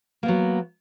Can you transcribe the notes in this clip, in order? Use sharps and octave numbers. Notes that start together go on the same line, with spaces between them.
F#3 A#3 B3